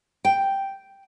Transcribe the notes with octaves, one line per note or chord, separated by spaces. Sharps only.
G5